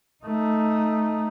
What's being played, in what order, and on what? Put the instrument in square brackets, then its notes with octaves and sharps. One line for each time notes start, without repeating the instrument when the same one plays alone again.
[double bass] A3 D#4